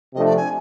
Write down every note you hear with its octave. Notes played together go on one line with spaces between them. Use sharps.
C3 F3 A3 D4 D#5
D5
G#5